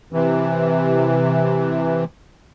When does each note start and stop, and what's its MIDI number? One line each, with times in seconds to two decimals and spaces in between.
0.13 2.04 48
0.13 2.04 52